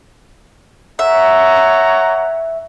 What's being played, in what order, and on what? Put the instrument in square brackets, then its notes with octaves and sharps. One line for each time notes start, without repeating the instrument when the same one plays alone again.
[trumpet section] C#5 F#5 A#5 [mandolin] E5